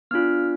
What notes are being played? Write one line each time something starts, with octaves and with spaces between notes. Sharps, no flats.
B3 D4 F4 F6